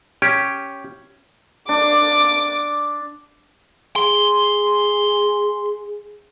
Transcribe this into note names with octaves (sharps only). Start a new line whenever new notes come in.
C#4 G4
D4 D6
G#4 C6